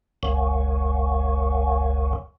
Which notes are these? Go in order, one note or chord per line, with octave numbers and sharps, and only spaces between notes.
F#1 C#2